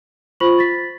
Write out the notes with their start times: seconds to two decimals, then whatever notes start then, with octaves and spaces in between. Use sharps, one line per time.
0.40 F4 C5 B5 C#6 F#7
0.59 A6 B6